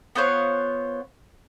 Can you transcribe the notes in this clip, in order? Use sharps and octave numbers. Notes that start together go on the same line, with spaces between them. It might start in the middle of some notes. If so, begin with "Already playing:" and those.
B3 F4 C5 C#5